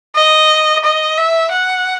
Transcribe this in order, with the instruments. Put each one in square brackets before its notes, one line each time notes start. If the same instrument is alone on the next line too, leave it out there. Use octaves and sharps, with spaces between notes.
[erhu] D#5
D#5
E5
F#5